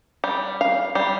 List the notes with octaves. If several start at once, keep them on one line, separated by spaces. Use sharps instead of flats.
G3
F5
G3